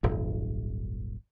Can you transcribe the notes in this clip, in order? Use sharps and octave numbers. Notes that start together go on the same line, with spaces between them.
D#1 G#1 F#2